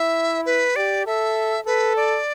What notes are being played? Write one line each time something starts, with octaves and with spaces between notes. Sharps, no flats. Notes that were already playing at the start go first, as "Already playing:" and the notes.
Already playing: E4 E5
B4
G4 D5
A4 E5
A4 B4
D5